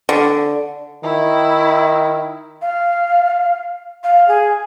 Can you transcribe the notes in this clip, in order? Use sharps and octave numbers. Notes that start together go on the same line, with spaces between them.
D3
D#3 E4
F5
F5
G#4